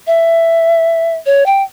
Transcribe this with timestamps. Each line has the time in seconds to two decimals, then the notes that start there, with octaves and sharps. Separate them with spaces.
0.07 E5
1.26 C#5
1.46 G5